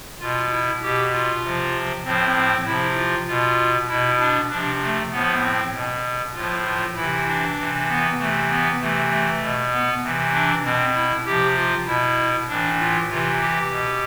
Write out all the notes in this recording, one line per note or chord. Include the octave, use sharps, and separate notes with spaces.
B2 F4
E4
B2 G4
F4
C3 F3
A2 F3 C4
C4
C3 F3 E4
F4
B2 F4
B2 E4
D4
C3 F3 D4
A3
A2 F3 B3
C4
B2
A2 F3 F4
F4
C3 E3 E4
D4
C3 E3
B3
C3 E3 A3
B3
C3 E3 A3
A3
B2
B3
C3 E3
D4
B2 C4
E4
C3 F3 G4
F4
B2 E4
A2 E3 D4
F4
C3 E3 F4
G4
B2